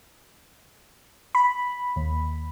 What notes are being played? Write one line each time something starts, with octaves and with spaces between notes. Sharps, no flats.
B5
D#2